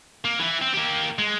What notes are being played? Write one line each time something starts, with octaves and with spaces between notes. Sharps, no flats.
A#3
E3 E4
C4
A#3 G4
G#3